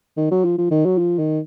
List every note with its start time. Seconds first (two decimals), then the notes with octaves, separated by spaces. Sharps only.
0.17 D#3
0.31 F#3
0.45 F3
0.58 F3
0.71 D#3
0.85 F#3
0.98 F3
1.19 D#3